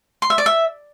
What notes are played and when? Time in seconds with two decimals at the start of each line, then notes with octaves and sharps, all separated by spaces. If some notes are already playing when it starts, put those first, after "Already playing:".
0.22 C6
0.30 E5
0.38 D5
0.46 E5